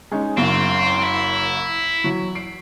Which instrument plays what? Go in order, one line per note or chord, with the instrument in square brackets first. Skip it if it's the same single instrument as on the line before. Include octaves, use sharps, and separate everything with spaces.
[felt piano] G#3 C#4 D#4
[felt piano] F#1 F#2 F5 [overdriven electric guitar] C4
[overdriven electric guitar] E4
[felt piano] E3 F#3
C7 D7